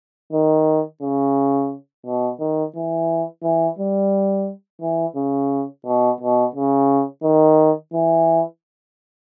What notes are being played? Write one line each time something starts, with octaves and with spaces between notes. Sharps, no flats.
D#3
C#3
B2
D#3
E3
E3
G3
E3
C#3
B2
B2
C#3
D#3
E3